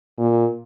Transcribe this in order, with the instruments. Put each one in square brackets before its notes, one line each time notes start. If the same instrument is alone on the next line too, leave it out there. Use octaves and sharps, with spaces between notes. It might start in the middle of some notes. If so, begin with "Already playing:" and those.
[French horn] A#2